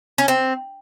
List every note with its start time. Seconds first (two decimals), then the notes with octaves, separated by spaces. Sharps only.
0.18 C#4
0.28 C4